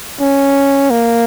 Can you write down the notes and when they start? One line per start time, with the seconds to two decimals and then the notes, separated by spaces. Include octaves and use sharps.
0.21 C#4
0.90 A#3